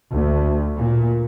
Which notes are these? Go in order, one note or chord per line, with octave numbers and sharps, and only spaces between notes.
D2
A#2